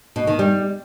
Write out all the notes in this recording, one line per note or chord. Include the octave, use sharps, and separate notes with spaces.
B2
D#3
G3